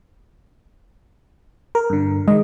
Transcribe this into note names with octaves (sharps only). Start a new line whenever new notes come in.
A#4
G2 D3
D#3 G#3 D#5